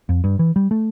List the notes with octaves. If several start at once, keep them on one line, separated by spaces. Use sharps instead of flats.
F2
G2
E3
G3
A3